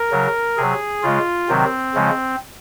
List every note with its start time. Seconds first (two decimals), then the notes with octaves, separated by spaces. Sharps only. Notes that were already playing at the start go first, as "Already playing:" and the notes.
Already playing: A#4
0.11 C#3 F#3
0.57 C3 F#3 G#4
1.03 C#3 G#3 F4
1.49 C3 D#3 F#3 C4
1.94 C#3 F3 G#3